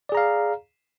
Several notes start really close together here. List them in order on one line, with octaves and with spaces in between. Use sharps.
D5 G#4 A#5 F5